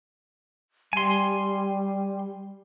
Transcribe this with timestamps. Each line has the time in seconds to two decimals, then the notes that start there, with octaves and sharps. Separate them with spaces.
0.93 G3 G#5 C6